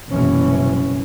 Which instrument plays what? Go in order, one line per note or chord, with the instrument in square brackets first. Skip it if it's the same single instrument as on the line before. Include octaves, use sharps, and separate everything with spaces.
[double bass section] F#1 C2 B2 E3 C#4